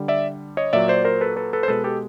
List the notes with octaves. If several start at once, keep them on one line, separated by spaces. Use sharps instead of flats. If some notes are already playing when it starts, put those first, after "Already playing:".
Already playing: D3 G3
D5 E5
C#5 D#5
A#2 F#3 D5 E5
C5 D5
A#4 C5
A4 B4
A4 B4
A4 B4
C5
B2 G#3 A4 B4
G4 A4